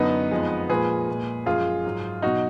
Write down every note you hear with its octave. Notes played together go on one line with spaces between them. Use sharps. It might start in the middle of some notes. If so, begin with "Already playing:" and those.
Already playing: F#2 D3 F#3 B3 D#4
F2 F3 G#3
A#2 F3 G#3 G#4 B4
A#2 G#3
F#2 F3 G#3 F4 G#4
G#2 F#3
B2 F#3 D#4 F#4